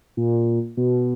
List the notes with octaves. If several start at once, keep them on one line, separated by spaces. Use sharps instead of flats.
A#2
B2